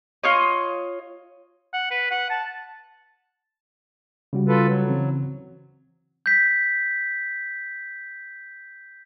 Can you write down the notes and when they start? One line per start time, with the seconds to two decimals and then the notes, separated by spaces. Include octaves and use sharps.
0.24 F4 C#5 D#5
1.73 F#5
1.91 B4
2.11 F#5
2.30 A5
4.33 C#3 G3 F#4
4.48 F4 A4 B4
4.67 F#3
4.88 C#3 E3 C4
6.26 G6 B6